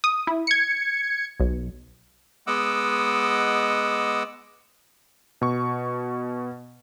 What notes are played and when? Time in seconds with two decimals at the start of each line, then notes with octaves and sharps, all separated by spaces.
0.04 D#6
0.27 E4
0.47 G#6 C#7
1.40 B1
2.47 G#3 B3 D#5 F#5 D6 E6
5.41 B2 C#6